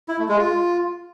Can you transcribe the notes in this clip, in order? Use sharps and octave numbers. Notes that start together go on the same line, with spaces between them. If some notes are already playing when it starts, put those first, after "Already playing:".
E4
A3
G#3
F4